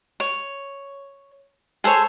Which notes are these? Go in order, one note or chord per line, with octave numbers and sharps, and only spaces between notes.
C#5
G#4 A4 C5 C#5